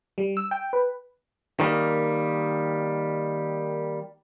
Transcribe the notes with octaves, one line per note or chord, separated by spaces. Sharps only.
G3
E6
G5
B4
D#3 G3 A#3